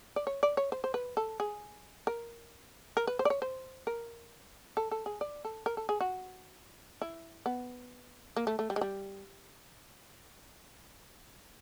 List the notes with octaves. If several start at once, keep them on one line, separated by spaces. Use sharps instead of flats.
D5
C#5
D5
C#5
C5
C5
B4
A4
G#4
A#4
A#4
B4
C5
D5
C#5
C5
A#4
A4
A4
G#4
D5
A4
A#4
A4
G#4
F#4
E4
B3
A#3
A3
A3
G3
G#3
G3